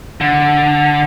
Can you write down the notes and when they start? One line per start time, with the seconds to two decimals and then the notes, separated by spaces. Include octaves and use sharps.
0.21 D3